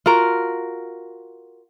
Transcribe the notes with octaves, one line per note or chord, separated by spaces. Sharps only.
F4 F#4 A#4